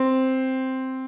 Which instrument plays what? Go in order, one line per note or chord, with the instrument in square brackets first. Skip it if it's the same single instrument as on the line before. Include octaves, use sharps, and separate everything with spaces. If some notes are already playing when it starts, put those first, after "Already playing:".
Already playing: [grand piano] C4